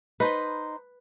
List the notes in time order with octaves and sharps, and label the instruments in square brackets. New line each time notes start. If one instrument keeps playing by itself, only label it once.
[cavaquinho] D#4 C5 B5 [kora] B4